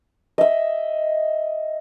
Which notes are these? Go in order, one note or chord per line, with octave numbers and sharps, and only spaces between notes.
D#5 E5